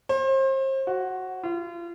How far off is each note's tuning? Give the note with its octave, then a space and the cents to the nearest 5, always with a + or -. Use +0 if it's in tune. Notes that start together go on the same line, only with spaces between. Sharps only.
C5 +35
F#4 +5
F4 -35